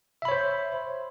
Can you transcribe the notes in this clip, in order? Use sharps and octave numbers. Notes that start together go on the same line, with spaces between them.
C5 C#5 E5 B5